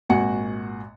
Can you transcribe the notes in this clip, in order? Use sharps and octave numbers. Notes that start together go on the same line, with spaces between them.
G#1 A#2 F#4 F#5 G#5 C#7